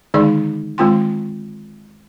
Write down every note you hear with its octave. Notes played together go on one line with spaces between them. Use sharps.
D3 D#3 G#3 D#4 G#4 D5
D#3 G#3 C4 F4 G5 C6